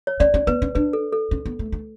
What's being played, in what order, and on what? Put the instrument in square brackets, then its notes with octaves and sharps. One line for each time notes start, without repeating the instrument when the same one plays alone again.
[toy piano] C#5
[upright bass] C#4 [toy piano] D5
[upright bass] C#4
[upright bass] B3 [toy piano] B4
[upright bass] C#4
[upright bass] D4 [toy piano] B4
[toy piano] A4
A4
[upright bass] C#4
B3
A3
A3